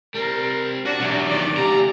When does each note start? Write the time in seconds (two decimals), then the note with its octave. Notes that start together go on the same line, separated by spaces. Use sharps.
0.14 G3 C4 A#4
0.86 D4 F#4
1.00 E2 B2 F#3 G3
1.30 D#3 B3 D5
1.56 C#3 A3 G4 A#5